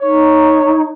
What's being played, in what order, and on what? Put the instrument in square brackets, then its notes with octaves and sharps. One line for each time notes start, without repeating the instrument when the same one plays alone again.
[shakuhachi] D#4 [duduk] C#5